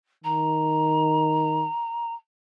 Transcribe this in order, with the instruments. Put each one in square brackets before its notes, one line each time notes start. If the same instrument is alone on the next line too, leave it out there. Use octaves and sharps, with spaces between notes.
[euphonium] D#3 [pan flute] A#5